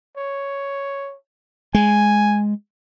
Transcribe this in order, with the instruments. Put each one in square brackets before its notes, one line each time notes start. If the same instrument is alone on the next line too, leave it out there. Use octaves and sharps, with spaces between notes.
[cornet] C#5
[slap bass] G#3 [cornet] G#5